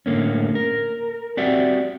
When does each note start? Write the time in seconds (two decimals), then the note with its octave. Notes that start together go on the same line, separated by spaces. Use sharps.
0.06 A2 D3 A#3 C#4
0.55 A#4
1.37 C4 F#4 G4 D5 E5 F#5